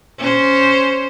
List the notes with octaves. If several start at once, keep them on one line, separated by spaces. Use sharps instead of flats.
C#4 C5